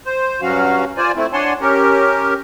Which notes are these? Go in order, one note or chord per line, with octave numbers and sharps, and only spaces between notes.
C5
G2 F#3 C#4 F#4 F5
F4 C5 D5 G#5
A3 C4 E4
D4 C#5 F#5 G#5 A5 C6
C#4 G4 A#4